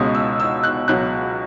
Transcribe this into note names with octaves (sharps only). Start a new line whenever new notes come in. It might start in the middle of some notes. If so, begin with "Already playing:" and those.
Already playing: C#2 B2 G#3 C#4 D#6
E6
E6
F#6
C#2 B2 F#3 F#6